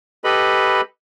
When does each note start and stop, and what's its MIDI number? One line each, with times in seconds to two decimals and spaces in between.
0.24 0.81 67
0.24 0.81 69
0.24 0.81 71
0.24 0.81 75
0.24 0.81 83